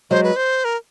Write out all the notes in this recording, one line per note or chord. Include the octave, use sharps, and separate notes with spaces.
F#3 G#3 C5
B4
C5
A#4